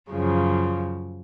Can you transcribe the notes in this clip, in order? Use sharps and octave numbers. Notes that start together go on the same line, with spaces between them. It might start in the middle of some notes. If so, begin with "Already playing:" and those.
F#2 C#3 F3